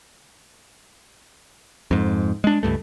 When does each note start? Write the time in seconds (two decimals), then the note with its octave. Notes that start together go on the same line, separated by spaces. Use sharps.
1.91 F2 G#2
2.44 G#3 D4
2.63 C#2 G2 A3